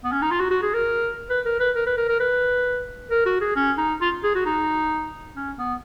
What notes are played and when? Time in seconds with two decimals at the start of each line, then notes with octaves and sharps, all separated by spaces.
0.04 B3
0.12 C#4
0.22 D#4
0.31 F4
0.40 F#4
0.51 F#4
0.63 G#4
0.74 A#4
1.30 B4
1.46 A#4
1.60 B4
1.76 A#4
1.87 B4
1.98 A#4
2.09 A#4
2.20 B4
3.10 A#4
3.26 F#4
3.41 G#4
3.56 C#4
3.78 D#4
4.01 F4
4.24 G#4
4.35 F#4
4.46 D#4
5.36 C#4
5.59 B3